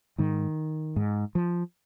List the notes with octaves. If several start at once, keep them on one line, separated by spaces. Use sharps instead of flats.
G#2 D#3
G#2
F3